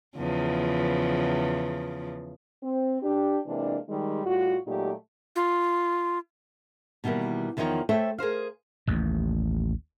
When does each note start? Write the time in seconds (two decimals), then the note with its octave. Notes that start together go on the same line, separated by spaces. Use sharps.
0.17 E2 C#3 F3
2.63 C4
3.02 D4 G4
3.47 C3 E3 G#3 A#3 D4
3.89 D#3 G3 G#3
4.25 A2 G3 F4 F#4
4.67 A#2 F#3 G#3 A3 D#4 G4
5.36 F4
7.04 B2 D#3 E3 G3 A#3
7.57 E2 D#3 F3 D#4 C#5 G5
7.89 A3 A4 C5 C#5 E5 G5
8.18 G#4 A#4 C5 F5
8.87 A1 D#2